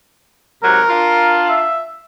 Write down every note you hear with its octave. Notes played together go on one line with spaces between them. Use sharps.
G#2 C3 F#3 A#4
D4 F4
E5